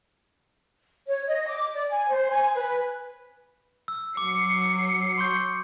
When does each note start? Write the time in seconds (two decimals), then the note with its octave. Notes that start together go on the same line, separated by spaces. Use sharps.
1.07 C#5
1.27 D#5
1.48 D6
1.73 D5
1.89 G#5
2.10 C5
2.29 G#5
2.56 B4
3.88 E6
4.17 F#3 D6 C7 C#7
5.18 C6 C#6 G6